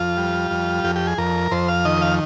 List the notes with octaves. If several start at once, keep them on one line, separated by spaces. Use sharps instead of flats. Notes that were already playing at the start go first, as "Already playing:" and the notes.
Already playing: F2 F4
G3
F2
F2 G4
G4
G#4
F2 A#4
F2 C5
F5
D#3 D#5
F5